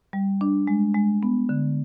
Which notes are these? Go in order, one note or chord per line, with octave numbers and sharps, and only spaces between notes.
G3
D4
G#3
G#3
B3
D3